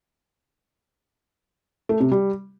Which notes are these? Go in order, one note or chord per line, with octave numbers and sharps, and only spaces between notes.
A3
C3
G3